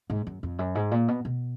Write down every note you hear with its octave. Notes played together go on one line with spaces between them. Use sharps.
G#2
F#2
F2
F#2
G#2
A#2
B2
B2